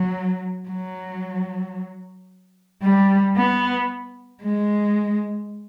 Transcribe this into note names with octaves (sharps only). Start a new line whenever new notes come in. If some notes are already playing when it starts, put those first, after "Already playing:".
Already playing: F#3
F#3
G3
B3
G#3